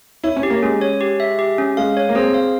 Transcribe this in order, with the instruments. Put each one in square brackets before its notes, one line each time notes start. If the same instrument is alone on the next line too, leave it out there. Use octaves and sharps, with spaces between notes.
[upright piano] E4 [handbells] C#5
[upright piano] C#4
[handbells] G4
[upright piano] A#3
[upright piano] G#3 [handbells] C#4
[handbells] C#5
G4
E5
G4
C#4
[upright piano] G#3 [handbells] F5
[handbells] C#5
[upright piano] A#3
[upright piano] C4 [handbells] G#4
[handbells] F5